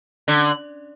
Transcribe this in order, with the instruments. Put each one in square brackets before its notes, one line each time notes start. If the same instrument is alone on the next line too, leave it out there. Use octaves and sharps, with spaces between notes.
[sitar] D3